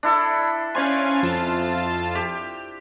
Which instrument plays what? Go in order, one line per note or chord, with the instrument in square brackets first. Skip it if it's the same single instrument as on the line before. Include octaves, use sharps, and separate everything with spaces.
[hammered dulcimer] D4 E4 A4
[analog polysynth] C#4 F5 G#5 [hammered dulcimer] C5 D5
[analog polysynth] F2 F4 A5
[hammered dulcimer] G4